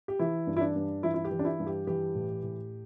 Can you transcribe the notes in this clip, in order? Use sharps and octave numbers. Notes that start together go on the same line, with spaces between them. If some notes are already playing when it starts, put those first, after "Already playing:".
G4
E3 E4
G2
E4
D4
G2
E3 E4
E4
G4
E3
D4
E4
G2
G4
E3 G4
A2
A2